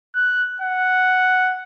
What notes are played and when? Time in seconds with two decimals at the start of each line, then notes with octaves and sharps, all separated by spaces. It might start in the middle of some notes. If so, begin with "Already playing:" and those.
0.15 F#6
0.62 F#5